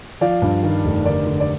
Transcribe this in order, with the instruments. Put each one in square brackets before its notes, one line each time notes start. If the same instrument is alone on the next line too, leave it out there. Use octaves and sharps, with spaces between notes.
[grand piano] F3 D5 F5
G2
D#3
F1
D3 A#4 D5
D3
D5